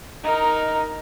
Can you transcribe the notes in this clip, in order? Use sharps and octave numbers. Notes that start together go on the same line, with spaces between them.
D#4 A#4